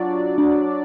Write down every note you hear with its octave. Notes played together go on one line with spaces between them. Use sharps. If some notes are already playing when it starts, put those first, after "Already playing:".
Already playing: F#3 D4 F4 F#4 D5
D4